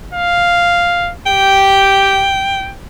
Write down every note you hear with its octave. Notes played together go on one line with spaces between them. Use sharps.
F5
G4 G5